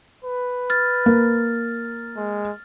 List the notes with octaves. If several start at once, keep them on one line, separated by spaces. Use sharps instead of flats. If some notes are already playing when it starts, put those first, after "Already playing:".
B4
F6 A6
A#3
G#3